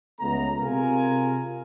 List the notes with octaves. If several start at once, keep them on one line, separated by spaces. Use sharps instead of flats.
C#2 A3 B3 A#5
C3 F4 G#4 A#4 G#5